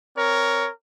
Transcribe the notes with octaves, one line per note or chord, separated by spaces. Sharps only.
C4 A#4 C#5